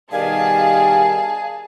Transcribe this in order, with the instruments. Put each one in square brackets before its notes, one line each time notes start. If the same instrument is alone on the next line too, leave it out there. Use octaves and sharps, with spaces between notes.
[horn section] B2 D#3 G3 [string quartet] G#4 A5 [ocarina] F5 [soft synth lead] G#5